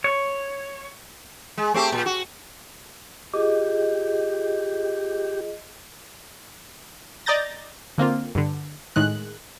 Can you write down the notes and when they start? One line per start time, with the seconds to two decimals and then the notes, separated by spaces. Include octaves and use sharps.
0.04 C#5
1.58 G#3
1.74 A3 C4 G4
1.92 A#2
2.06 F#4
3.34 F4 G4 G#4 D#5
7.26 D5 D#5 A#5 G6 A6 A#6
7.98 D3 A#3 C4 F4
8.35 G2 D3
8.96 A2 D#3 G#3 F#6